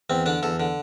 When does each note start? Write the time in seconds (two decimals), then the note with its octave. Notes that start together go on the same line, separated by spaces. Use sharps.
0.10 E2 C4
0.26 D3 D4
0.43 E2 A4
0.60 D3